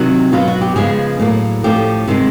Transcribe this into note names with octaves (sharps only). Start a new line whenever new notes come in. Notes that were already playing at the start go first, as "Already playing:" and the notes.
Already playing: C3 D#3 F#3 F#4
B2 F#3 B3 F4
F#4
G4
C#3 F3 G#3 B3 G#4
A2 F#3 A#3
A2 F3 A3 C#4 G4
C3 D#3 G#3